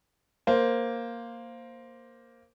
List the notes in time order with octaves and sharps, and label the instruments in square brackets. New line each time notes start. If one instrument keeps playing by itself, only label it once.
[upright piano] A#3 C5